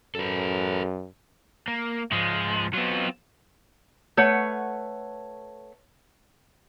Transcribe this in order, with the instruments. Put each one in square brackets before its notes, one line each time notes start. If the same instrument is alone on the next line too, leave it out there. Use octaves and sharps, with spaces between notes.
[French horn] F#2 [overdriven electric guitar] A4 B4
[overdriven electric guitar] A#3
[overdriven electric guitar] G#2 F3 [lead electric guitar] G#3
[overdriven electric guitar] F#3 B3 [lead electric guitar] C4 F4
[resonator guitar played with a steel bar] A3 B4 C#5 F#5